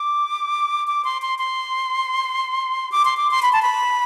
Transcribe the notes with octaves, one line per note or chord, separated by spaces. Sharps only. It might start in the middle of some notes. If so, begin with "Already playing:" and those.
Already playing: D6
D6
C6
C6
C6
D6
C6
D6
C6
B5
A5
B5